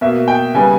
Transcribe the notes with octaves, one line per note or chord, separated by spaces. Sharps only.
B2 A#3 E5
G5
C#3 G3 B3 G#5